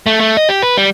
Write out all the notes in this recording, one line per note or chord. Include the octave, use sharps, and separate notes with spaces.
A3
A3
D#5
G4
B4
G3